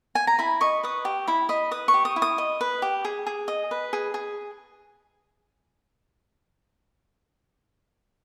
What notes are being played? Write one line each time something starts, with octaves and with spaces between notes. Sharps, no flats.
G#5
A#5
E4 B5
D#5 C#6
B4 D#6
G4
E4 B5
D#5 B5
B4 D#6
C#6
G4
D#6
E4
D#6
D#5
B4
G4
G#4
G#4
D#5
B4
G#4
G#4